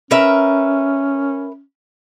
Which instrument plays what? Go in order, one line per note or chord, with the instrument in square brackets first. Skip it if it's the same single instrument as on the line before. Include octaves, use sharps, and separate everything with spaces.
[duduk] C#4 [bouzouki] A#4 B4 E5